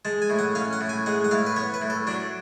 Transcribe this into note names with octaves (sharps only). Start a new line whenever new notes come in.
G#3 A5
G#5
A2
F#5
C#4 F5
F#5
A2
G#5
G#3 F#5
F#5
A2 F5
B4
B3 C#5
B4
A2
A4
F#3 D4